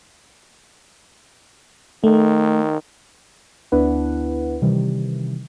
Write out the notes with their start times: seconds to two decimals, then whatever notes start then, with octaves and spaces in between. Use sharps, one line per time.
2.04 D#3 A3
3.72 D2 B3 D4 E4 B4 F#5
4.62 C3 D#3 E3 G3